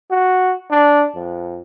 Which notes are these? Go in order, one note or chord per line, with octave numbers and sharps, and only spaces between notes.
F#4
D4
F2